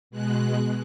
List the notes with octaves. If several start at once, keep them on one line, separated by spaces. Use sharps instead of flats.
B2 G#3 F#6